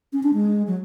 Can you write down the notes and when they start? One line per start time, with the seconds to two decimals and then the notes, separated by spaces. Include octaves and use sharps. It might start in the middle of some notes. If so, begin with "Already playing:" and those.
0.13 C#4
0.23 D4
0.34 G#3
0.67 F#3